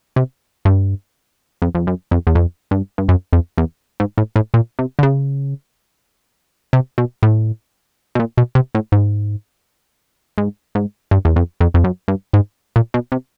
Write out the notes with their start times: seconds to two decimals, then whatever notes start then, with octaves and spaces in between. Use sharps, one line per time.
0.16 C3
0.65 G2
1.62 F2
1.75 F2
1.87 F#2
2.11 F2
2.27 E2
2.35 F2
2.71 G2
2.98 G2
3.09 F#2
3.33 F2
3.58 E2
4.00 G#2
4.18 A2
4.36 A2
4.54 A#2
4.79 C3
4.99 D3
5.03 C#3
6.73 C3
6.98 B2
7.23 A2
8.15 B2
8.20 A#2
8.38 B2
8.55 C3
8.75 A2
8.92 G#2
10.38 G#2
10.75 G#2
11.11 G2
11.25 E2
11.36 F2
11.61 F2
11.74 F2
11.84 F#2
12.08 G2
12.33 G#2
12.76 A#2
12.94 B2
13.12 C3